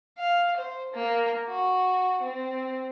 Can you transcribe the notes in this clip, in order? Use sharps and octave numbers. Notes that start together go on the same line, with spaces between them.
F5
C5
A#3
F#4
C4